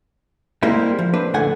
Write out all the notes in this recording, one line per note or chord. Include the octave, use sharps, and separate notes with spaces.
G3 G#3 A#3 C4 E4
F3
C4 D4 B4
C#2 A2 D3 A4 F#5 G#5